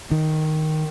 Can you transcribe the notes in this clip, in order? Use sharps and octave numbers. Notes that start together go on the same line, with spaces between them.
D#3